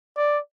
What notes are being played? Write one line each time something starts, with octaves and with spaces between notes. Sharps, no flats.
D5